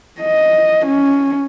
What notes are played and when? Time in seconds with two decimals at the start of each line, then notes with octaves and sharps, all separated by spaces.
0.21 D#5
0.86 C#4